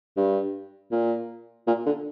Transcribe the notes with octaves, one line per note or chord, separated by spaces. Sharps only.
G2
A#2
A#2
D3